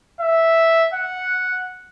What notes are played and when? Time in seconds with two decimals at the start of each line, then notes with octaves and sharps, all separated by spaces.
0.21 E5
0.94 F#5